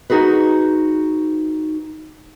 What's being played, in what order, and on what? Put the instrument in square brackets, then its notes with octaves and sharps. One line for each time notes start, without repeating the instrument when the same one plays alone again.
[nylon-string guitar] D#4 F#4 G#4 B4